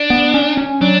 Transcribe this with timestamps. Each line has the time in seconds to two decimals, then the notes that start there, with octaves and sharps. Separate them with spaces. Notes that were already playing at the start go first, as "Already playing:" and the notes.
Already playing: D4
0.10 B3
0.34 C#4
0.57 C#4
0.81 F#3 D4